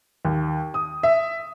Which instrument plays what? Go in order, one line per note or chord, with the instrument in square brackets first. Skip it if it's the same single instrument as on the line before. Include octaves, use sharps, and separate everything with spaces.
[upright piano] D#2
D#6
E5